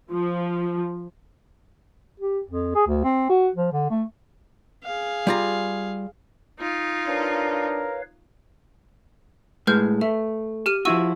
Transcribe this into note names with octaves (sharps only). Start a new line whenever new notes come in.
F3
G4
F2
G#4
D2
C4
F#4
F3
D3
A3
G#4 F5
G3 F4 A#5
D#4 F4
D4 A#4 B4 C#5 F5
A2 G#3 B4 F6 G6
A3 E5
G4 F6 D#7
F3 E4 F#4 C#6 E6 D#7